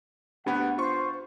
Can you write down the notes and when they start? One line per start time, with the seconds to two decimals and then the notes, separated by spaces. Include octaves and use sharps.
0.46 D2 B3 D4 G4 F#5 B5
0.78 F4 C5 C#6